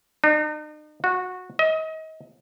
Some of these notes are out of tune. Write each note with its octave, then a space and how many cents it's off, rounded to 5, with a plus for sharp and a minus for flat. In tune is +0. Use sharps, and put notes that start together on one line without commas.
D#4 -45
F#4 -15
D#5 +35